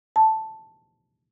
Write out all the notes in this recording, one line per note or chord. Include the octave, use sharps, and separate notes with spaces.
A5